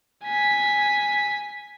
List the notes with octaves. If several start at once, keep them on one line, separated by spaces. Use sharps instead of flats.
G#5 B6